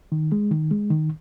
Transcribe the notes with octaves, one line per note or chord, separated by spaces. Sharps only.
D#3
G#3
D#3
G#3
D#3